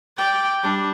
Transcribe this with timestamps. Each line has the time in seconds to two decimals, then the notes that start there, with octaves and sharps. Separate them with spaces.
0.17 D5 G5
0.63 G3 D4